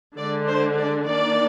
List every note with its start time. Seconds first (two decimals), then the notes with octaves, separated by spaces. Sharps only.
0.18 D3 G#3 D4 D5
0.48 C5
0.78 D5
1.08 D#3 A#3 D4 D5